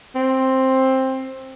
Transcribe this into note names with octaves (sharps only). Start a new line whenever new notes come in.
C4